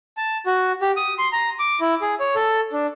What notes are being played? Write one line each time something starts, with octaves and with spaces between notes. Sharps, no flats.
A5
F#4
G4
D#6
C6
A#5
D6
E4
G#4
C#5
A4
D4